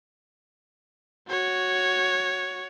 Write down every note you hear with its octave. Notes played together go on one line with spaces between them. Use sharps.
F#4 C#5